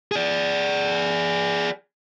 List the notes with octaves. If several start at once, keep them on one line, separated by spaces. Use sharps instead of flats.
G#4 D5